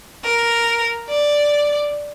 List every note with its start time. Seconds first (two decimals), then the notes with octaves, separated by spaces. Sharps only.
0.24 A#4
1.09 D5